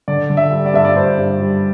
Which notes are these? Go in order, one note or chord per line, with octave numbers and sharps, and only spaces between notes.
D3 D5
D3
E5
G3
D5
G2 E5
D5
G2 C5
G2
G3